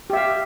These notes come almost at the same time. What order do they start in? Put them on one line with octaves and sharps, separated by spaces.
G4 E5 F5